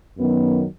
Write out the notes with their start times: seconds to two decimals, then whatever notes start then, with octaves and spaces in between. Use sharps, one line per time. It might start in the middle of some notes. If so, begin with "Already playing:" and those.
0.18 F#2 D#3 F#3 B3